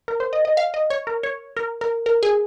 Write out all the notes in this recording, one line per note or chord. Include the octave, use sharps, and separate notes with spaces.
A#4
C5
D#5
D#5
F5
D#5
C#5
A#4
C#5
A#4
A#4
A#4
G#4